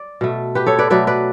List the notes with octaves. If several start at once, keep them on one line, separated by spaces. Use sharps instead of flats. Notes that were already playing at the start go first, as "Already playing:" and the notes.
Already playing: D5
B2 A3
G4 B4
A4 C#5
B4 D5
B2 F#3 A3 B4 D5
B4 D5